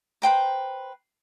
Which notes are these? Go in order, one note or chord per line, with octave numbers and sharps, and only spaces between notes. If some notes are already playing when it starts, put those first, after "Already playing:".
B4 C5 G5 A#5